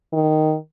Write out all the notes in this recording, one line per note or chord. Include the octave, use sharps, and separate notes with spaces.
D#3